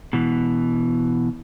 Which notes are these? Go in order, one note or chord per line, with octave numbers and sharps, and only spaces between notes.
B2 E3